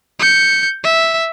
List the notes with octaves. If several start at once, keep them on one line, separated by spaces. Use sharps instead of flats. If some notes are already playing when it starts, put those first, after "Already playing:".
G6 C#7
E5